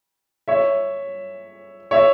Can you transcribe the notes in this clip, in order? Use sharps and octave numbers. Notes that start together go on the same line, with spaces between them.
C#5 E5
C#5 E5